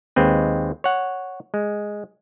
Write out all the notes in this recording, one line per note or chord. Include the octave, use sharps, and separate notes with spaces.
D#2 G#3 C4 B4
C#5 F#5
G#3